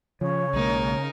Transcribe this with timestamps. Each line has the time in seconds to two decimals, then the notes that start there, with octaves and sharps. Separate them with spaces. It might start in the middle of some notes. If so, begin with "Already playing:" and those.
0.21 C#3 F3 C#5
0.54 B1 G#3 A#3 D#4 A#4